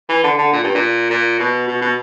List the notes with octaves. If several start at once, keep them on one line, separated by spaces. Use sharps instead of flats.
E3
D3
D3
A#2
G2
A#2
A#2
B2
B2
B2